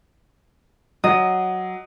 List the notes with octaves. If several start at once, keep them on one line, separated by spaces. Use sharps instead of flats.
F#3 D#5